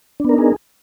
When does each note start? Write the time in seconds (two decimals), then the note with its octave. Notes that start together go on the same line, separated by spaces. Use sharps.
0.20 D4
0.24 B3
0.29 A#4
0.34 D#4
0.38 G#4